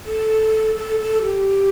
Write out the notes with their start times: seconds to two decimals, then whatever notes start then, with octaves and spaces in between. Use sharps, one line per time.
0.05 A4
0.76 A4
1.00 A4
1.23 G4